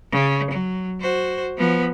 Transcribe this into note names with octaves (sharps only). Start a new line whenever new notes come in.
C#3
F#3
F#4 C5
F3 B3